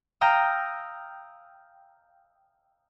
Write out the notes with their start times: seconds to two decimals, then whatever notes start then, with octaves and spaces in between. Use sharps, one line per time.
0.21 F5 G5 A#5 D#6 E6